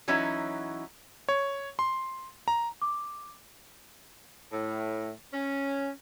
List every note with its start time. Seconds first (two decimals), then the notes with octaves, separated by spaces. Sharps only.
0.08 E3 F#3 C#4 D#4 E4 F#4
1.29 C#5
1.79 C6
2.48 A#5
2.82 D6
4.52 A2
5.34 C#4